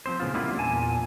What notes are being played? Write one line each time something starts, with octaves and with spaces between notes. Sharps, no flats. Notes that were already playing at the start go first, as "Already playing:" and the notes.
F3 C4 C5
A2 C#3 B3 F4
G3 A#3 B3 D4 E4 F4
E2 A#2 G#5 A5